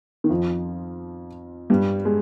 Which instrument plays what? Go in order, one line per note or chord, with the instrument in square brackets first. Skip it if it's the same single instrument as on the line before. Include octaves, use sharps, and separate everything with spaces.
[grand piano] D#3
F2 F3
G2 G3
G#3